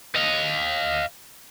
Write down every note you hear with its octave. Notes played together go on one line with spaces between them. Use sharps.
D#5 F5